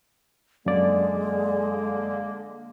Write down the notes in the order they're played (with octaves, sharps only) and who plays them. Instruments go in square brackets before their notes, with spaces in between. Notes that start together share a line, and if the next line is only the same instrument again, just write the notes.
[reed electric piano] F#2 D5 [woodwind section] D3 A#3 [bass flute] G#3